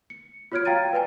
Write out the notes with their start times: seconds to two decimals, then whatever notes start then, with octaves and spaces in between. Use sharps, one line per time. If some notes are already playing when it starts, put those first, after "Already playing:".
0.10 C#7
0.52 F4 F#4 C#5 F6 G#6 D7
0.65 F5 G5 A#5 A6 D#7
0.93 B4 D5 G5 G#5